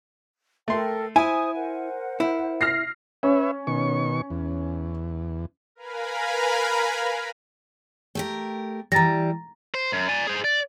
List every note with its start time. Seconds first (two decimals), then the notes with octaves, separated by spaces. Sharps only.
0.68 A3 A4 A#4 G5 C6
1.16 E4 C5 G#5 D#6
1.54 A#4 C5 F#5
2.20 E4
2.61 F6 A#6 C7
3.23 C#4 B4 C#5 E5
3.67 B2 D#3 C#6
4.30 E2
5.75 A#4 B4 F5 G#5 A#5 B5
8.15 A3 G4 A#4
8.92 E3 G3 A#5 A6 A#6
9.74 C5
9.92 F#2
10.09 D5 G#5
10.27 G#4 C5
10.44 D5